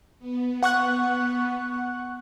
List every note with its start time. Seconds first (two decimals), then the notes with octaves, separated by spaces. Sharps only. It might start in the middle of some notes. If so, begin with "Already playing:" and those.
0.19 B3
0.63 F#5 C#6 F#6